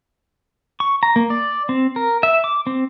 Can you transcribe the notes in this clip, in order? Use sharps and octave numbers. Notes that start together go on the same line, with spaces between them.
C#6
A#5
A#3
D5
C4
A#4
E5
D6
C4